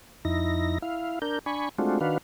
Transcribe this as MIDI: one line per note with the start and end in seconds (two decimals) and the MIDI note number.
0.25 0.78 41
0.25 0.78 63
0.25 0.78 64
0.25 0.78 94
0.82 1.19 64
0.82 1.19 77
1.22 1.39 62
1.22 1.39 70
1.22 1.39 91
1.46 1.69 62
1.46 1.69 80
1.46 1.69 83
1.46 1.69 85
1.79 1.99 56
1.79 1.99 57
1.79 1.99 60
1.79 1.99 62
1.79 1.99 65
1.79 1.99 66
2.01 2.18 51
2.01 2.18 62
2.01 2.18 66
2.01 2.18 71
2.01 2.18 77